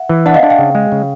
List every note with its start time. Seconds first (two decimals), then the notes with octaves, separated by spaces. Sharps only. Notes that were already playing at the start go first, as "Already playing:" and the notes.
Already playing: E5 F#5
0.09 E3
0.26 D4 E5 F#5
0.34 D#5 F5
0.43 D4
0.50 F5 G5
0.59 C#3
0.75 G#3
0.92 C#3